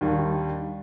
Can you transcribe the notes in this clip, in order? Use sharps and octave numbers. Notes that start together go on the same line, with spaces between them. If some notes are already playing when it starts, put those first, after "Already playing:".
D#2 D#3 G3 D4